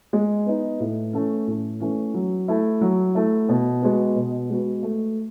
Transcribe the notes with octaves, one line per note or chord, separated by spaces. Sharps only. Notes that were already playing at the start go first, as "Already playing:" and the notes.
G#3
B3 D#4
A2
E3 A3 C#4
A2
E3 A3 C#4
F#3
A3 E4
F#3
A3 E4
B2
G#3 B3 F#4 B4
B2
G#3 B3 F#4 B4
A3